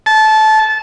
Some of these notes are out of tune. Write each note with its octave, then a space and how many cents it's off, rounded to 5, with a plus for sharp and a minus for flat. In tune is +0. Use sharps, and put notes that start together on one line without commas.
A5 -20